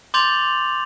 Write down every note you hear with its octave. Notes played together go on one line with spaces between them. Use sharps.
C6 D6 G6 A6 F7 F#7